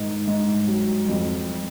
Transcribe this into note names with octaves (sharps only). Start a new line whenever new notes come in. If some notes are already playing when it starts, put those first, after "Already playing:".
Already playing: G#2 D#3
G#2
F#3
F2